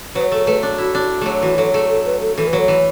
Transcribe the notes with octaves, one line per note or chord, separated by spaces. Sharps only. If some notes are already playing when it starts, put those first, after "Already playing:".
F#3 B4
A3 A4
A3 B4
D4 A4
E4 F#4
D4
F#3 A3
E3 F#4
F#3 A4
A3 A4
A4
B4
A4
E3 A4
B4
F#3
A4
E3